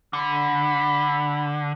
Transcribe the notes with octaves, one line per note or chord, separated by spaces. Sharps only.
D3 B5